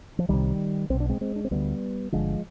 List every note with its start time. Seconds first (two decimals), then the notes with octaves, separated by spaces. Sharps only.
0.19 F3
0.29 C2 C3 D#3 G3
0.90 B1 B2 C4
1.00 D4
1.09 G#3 C4
1.21 G#3 C4
1.36 D4
1.45 C4
1.51 D2 D3 G3 B3
2.12 G1 F2 D3 F3 G#3